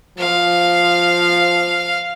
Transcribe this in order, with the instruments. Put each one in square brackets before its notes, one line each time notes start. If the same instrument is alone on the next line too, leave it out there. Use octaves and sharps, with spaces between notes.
[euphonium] F3 [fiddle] F5